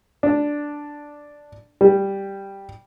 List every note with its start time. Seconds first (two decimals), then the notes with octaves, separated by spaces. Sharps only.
0.23 D4
1.81 G3